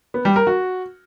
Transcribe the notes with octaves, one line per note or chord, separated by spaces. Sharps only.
B3
G3
A#4
F#4